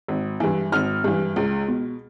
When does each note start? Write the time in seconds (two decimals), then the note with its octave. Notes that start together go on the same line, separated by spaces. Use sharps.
0.08 G#1
0.40 G2 E3
0.72 G#1 F6
1.04 G2 E3
1.36 C#2
1.68 B2